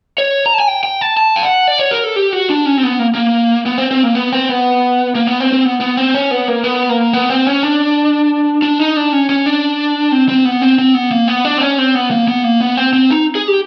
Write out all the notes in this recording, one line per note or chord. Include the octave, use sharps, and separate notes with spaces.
C#5
A#5
A5
G#5
G5
G5
A5
A5
G5
F#5
D5
C#5
A#4
A4
G4
F#4
D4
C#4
C4
B3
A#3
A#3
B3
C4
C4
A#3
B3
C4
B3
A#3
B3
C4
C4
B3
B3
C4
C#4
B3
A#3
B3
A#3
B3
C4
C#4
D4
D4
D#4
D4
C#4
C#4
D4
C4
C4
B3
C4
C4
B3
A#3
B3
D4
C4
C#4
C4
B3
A#3
B3
A#3
B3
C4
C4
D#4
G#4
G4